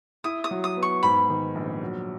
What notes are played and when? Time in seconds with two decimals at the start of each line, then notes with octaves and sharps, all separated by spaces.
0.24 E4 D#6
0.44 D#6
0.51 F#3
0.64 D#6
0.77 B3
0.83 C#6
1.03 G#2 B5
1.30 D#3
1.55 A#1
1.82 F#3